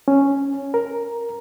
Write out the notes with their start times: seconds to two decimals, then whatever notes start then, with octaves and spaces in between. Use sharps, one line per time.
0.08 C#4
0.74 A#4